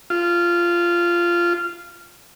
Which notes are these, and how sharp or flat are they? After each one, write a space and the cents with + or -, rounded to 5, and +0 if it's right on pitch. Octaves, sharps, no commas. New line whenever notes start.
F4 -15